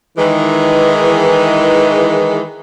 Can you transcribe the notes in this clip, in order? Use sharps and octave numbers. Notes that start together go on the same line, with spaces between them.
D#3 E3 G#3